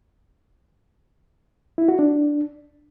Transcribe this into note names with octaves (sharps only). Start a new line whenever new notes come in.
E4
F#4
D4